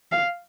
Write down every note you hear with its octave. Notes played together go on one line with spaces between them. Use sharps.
F5